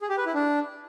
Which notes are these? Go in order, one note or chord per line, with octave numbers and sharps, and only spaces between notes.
G#4
G4
B4
E4
D4